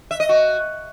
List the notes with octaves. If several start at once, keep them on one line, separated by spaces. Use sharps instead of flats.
E5
D#5
F#4